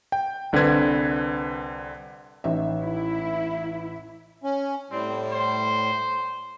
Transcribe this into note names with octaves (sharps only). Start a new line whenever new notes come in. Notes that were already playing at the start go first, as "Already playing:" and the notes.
G5
C2 D3 C4 B4 G#6
A1 D#4 E5
E4
C#4
A2 G3 C4
C5